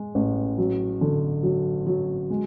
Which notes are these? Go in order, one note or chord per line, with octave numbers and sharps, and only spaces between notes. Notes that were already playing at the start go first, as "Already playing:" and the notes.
Already playing: G#3
A1
F#3
D3
F#3
F#3
G#3